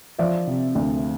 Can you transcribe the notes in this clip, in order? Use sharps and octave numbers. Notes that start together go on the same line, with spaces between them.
F3 D5 E5
C3
D2